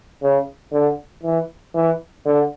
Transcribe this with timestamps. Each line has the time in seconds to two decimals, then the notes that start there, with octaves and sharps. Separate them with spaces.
0.22 C#3
0.73 D3
1.24 E3
1.75 E3
2.26 D3